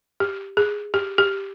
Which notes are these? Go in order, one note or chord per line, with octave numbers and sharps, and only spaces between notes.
G4
G#4
G4
G4